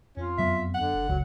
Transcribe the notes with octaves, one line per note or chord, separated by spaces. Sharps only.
F2 C#4 F4
F#2 F#3 B3 E5
D3 F#5
F#1
C#2 F#3